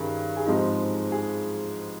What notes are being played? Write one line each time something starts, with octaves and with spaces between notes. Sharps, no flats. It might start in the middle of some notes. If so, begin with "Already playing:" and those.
Already playing: G2 D#3 C#4 G#4 A#4
G#4
G#2 F3 G#3 C4 D#4 G4
G#4